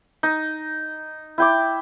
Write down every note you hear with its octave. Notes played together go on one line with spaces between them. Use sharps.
D#4
E4 G5 D6